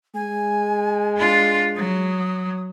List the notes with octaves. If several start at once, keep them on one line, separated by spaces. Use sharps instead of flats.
G#3 G#5
D4 F4
F#3 D#6